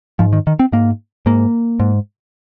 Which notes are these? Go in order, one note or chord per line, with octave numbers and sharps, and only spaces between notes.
G#2 F3
D#3
D#3
C4
G#2 A#3
G#2 A#3
G#2